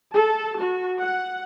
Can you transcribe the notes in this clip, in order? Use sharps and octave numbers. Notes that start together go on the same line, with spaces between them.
A4 A5
F#4
F#5